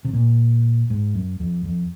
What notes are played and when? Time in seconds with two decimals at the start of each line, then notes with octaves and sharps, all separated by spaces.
0.05 C3
0.13 A#2
0.90 G#2
1.15 F#2
1.40 F2
1.65 F2